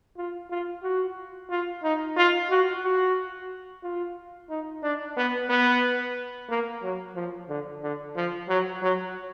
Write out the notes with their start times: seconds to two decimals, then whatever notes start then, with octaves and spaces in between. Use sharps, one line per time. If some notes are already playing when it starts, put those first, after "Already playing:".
0.17 F4
0.51 F4
0.83 F#4
1.50 F4
1.83 D#4
2.17 F4
2.50 F#4
2.83 F#4
3.84 F4
4.49 D#4
4.83 D4
5.17 B3
5.50 B3
6.49 A#3
6.83 F#3
7.15 F3
7.49 D3
7.83 D3
8.16 F3
8.49 F#3
8.82 F#3